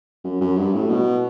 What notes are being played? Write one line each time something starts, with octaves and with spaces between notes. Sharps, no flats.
F#2
F#2
G2
A2
B2